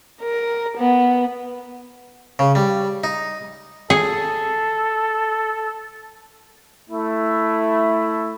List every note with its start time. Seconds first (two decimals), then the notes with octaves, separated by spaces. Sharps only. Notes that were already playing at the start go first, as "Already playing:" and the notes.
0.22 A#4
0.78 B3
2.39 C#3
2.55 G3
3.04 D#4
3.90 G#4 A4
6.90 A3 E4